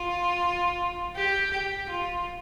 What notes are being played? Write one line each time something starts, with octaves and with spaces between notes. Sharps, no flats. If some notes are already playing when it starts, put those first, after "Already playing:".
Already playing: F4
G4
G4
F4